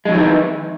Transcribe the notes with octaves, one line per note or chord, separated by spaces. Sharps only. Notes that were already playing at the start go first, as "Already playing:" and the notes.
F2 D#3 E3 F#3 G#3